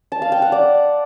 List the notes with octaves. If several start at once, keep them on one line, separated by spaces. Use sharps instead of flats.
A5
F5
G5
F#5
D5